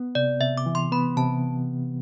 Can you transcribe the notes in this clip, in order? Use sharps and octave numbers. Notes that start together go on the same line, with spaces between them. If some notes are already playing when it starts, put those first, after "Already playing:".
Already playing: B3
C3 D5
C3 E5
D6
E3
C6
B3 B5
C3 A5